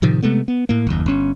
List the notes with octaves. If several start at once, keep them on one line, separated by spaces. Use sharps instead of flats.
A2 C3 D#3 F3
C3 G#3 A3 B3
B3
A2 A#3
F#1 D#2
G1 C#4